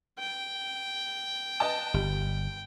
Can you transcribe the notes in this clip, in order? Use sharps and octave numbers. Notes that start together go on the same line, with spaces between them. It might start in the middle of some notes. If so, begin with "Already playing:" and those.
G5
B4 D#5 A5
G1 G3